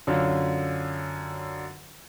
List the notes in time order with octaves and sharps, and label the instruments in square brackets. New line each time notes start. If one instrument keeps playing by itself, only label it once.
[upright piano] F#2 D3 C#4 F4